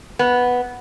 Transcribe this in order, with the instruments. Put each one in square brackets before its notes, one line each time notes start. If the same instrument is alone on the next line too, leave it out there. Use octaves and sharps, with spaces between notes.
[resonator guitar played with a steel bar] B3